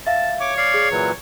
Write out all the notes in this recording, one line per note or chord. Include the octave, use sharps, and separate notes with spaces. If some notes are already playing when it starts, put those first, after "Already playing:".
E5 F5 A5
C#5 D6
D5 F5
G#4
A#2 E3 F#3